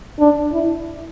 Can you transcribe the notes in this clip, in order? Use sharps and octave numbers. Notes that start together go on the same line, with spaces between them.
D4
E4